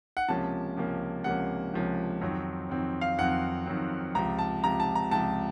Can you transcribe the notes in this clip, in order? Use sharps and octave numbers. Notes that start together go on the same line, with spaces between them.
F#5
C#2 C3 F3 A#3 C#4 A5
C#2 C3 F3 A#3 C#4
C#2 C3 F3 A#3 C#4 F#5
C#2 C3 F3 A#3 C#4
F2 D#3 F#3 C4
F2 D#3 F#3 C4
F5
F2 D#3 F#3 C4 F#5
F2 D#3 F#3 C4
C#2 C3 F3 A#5
A5
C#2 C3 F3 A#5
A5
A#5
C#2 C3 F3 A5